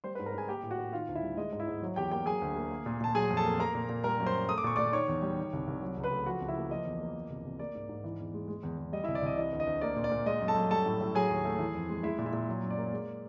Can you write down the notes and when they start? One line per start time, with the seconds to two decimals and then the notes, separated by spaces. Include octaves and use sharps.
0.04 G3 C5 C6
0.15 B4 B5
0.19 G#2
0.26 A#4 A#5
0.34 G#2 G#4 G#5
0.48 A#3 G4 G5
0.63 A2
0.71 F#4 F#5
0.79 A2
0.93 D#3 F4 F5
1.08 D2
1.15 E4 E5
1.23 G3
1.37 G#3 D#5
1.53 G#2
1.60 E4 E5
1.68 G#2
1.82 F#3
1.96 E2 G4 G5
2.11 A#3 G4 G5
2.26 F#3 G#4 G#5
2.41 D2
2.56 A#3
2.71 A#3
2.86 A#2
3.01 A#2 A5
3.15 F#3 G#4 G#5
3.31 F2
3.37 A4 A5
3.45 A#3
3.60 A#3 A#4 A#5
3.75 A#2
3.89 A#2
4.04 G3 A#4 A#5
4.19 F#2
4.26 C5 C6
4.33 A#3
4.49 A3 D#6
4.58 D6
4.64 A#2 C#6
4.76 A#2 D5 D6
4.93 D#3 C#5 C#6
5.08 E2
5.22 G3
5.37 D#3
5.53 C2
5.67 C2
5.82 F#3
5.97 C#2
6.04 B4 B5
6.12 A3
6.26 F3 F#4 F#5
6.41 C#2
6.48 E4 E5
6.56 A#3
6.71 F3 D#5
6.86 E2
7.01 A#3
7.15 F3
7.30 C2
7.45 C2
7.59 A#3 D5
7.75 G#2
7.89 G#2
8.04 E3
8.19 E2
8.34 G#3
8.48 G#3
8.63 E2
8.78 E2
8.92 G3 D#5
9.04 E4 E5
9.08 C2
9.15 D5
9.22 C2 D#5
9.37 E3 D#5
9.52 D2
9.60 D#5
9.67 D2
9.81 A#3 D5
9.96 A#2
10.04 D5
10.11 A#2
10.26 G#3 D#5
10.41 F#2
10.48 A4 A5
10.56 F#2
10.70 G3 A4 A5
10.86 A2
11.01 A2
11.15 F#3 G#4 G#5
11.30 D#2
11.45 A3
11.59 E3
11.74 F2
11.90 G#3
12.03 G#3 E4 E5
12.19 A#2
12.26 E4 E5
12.33 A#2
12.48 F#3
12.63 F#2
12.71 D5
12.78 A#3
12.93 G#3